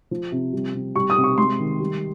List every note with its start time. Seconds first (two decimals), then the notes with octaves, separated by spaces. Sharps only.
0.11 F3
0.32 C3
0.53 G3
0.74 C3
0.96 G3 C#6
1.10 D#6
1.17 C3
1.24 C#6
1.38 G#3 C6
1.59 D#3
1.80 G3